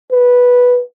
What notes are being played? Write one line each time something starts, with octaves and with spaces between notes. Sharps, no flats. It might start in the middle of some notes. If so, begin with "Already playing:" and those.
B4